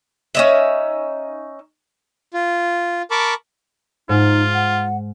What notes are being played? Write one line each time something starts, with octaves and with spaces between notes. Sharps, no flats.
C#4 D#4 E5
F4
A#4 A5 B5 C#6 D6
G#2 D#4 F4
F#5